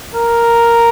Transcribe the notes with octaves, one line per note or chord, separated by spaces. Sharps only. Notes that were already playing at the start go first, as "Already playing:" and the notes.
A#4